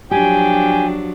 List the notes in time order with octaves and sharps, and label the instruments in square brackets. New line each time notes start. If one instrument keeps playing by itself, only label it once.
[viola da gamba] F3 F#3 D4 [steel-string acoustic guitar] G4 [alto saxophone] G5 [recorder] G#5